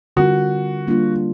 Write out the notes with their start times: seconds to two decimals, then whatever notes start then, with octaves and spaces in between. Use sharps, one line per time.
0.17 D3 G3 C4 F4 F#4 A#4
0.87 G3 A#3 D4 F4